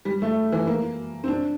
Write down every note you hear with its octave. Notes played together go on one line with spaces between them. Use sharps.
G3
A3
E3
A#3
C4
D4